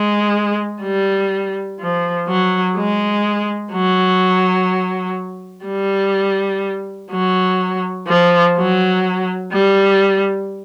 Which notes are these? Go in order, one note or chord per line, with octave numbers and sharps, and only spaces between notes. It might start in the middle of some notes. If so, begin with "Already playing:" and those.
Already playing: G#3
G3
F3
F#3
G#3
F#3
G3
F#3
F3
F#3
G3